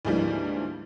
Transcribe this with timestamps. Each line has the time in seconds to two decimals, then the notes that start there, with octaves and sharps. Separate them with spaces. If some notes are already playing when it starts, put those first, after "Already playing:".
0.05 D2 G#2 E3 F3 G3 A#3